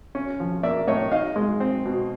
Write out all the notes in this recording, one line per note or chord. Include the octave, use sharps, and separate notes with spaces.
C#4
F3
A#3 D5 E5
A2 C#5 D#5
D#4 D#5 F5
G#3
C4
B2